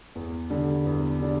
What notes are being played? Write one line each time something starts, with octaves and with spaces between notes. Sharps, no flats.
E2
D3 G3 D4
E2
D3 G3 D4